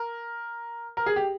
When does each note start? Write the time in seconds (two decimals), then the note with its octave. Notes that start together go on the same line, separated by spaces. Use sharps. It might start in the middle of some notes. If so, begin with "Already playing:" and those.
Already playing: A#4
0.97 A#4
1.06 G#4
1.16 G4